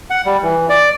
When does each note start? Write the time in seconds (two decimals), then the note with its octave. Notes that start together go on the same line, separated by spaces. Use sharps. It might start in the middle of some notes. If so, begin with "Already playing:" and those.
0.10 F#5
0.26 G3
0.43 E3
0.69 D5